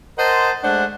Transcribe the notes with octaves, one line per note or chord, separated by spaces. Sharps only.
A#4 C5 D#5 F#5 A5 C6
G#3 A3 D4 C5 F#5